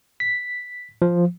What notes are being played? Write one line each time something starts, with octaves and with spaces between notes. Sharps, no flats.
B6
F3